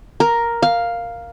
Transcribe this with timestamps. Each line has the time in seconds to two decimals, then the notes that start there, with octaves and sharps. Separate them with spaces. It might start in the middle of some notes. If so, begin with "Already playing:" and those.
0.20 A#4
0.62 F5